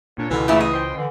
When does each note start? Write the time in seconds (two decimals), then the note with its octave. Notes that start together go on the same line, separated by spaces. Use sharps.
0.18 A#2 D4 C#5
0.31 C#2 B2 D3 E3
0.48 A#2 A3 E4 G#4
0.61 D#5
0.73 C5 G5 C6
0.97 D3 E3